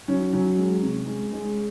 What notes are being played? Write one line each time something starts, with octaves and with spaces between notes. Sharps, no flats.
F#3 C#4
F#3 C#4
G#3
C3
G#3
G#3